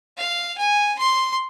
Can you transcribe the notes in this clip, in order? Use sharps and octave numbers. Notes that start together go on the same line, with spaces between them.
F5
G#5
C6